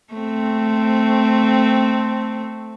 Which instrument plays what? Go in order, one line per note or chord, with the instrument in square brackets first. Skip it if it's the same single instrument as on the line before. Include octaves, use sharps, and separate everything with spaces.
[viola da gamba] A3 C4